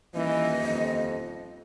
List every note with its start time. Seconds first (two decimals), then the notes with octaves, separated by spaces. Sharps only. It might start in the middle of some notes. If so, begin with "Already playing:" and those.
0.15 D#1 E3 D#5
0.61 F2